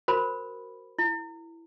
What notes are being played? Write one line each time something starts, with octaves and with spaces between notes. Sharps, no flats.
F#4 A#4 C5 B5
E4